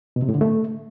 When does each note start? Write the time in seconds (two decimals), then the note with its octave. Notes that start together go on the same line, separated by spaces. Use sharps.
0.16 B2
0.22 C3
0.29 A2
0.35 D3
0.41 A3